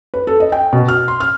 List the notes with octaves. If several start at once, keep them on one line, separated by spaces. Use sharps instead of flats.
B4
A4
D#5
G5
B2
F6
C6
F6